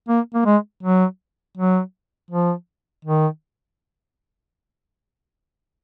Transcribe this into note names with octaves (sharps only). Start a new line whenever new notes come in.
A#3
A#3
G#3
F#3
F#3
F3
D#3